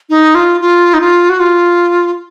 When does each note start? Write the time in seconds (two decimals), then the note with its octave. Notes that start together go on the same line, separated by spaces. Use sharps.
0.10 D#4
0.35 F4
0.61 F4
0.94 D#4
1.01 F4
1.30 F#4
1.40 F4